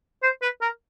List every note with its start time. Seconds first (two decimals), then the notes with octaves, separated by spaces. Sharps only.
0.23 C5
0.42 B4
0.61 A#4